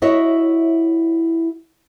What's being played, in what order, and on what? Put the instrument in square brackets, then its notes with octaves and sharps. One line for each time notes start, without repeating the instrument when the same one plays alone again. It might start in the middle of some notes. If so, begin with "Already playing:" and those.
[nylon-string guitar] E4 F#4 C#5 D#5 E5